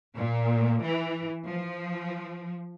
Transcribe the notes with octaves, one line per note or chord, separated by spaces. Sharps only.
A#2
E3
F3